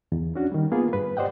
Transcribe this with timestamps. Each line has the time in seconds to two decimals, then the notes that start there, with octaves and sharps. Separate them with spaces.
0.12 E2
0.35 C#4 D4 F#4
0.52 D#3 G3
0.72 A#3 B3 F4 G#4
0.93 G2 B4
1.17 G4 C5 D5 D#5 F#5 G5